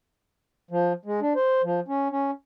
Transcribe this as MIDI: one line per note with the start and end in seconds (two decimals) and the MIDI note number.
0.71 0.93 53
1.05 1.20 56
1.21 1.33 62
1.35 1.62 72
1.63 1.80 53
1.88 2.08 61
2.11 2.31 61